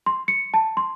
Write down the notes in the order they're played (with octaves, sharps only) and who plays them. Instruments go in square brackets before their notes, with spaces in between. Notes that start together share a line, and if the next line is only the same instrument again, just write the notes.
[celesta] C6
C#7
A5
C6